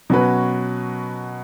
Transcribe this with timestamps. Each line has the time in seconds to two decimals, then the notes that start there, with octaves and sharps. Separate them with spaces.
0.10 B2 F#3 C#4 F#4 B4